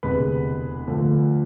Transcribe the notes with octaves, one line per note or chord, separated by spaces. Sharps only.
E1 D2 C3 G#3 B4 B5
D2 D3 F3 A3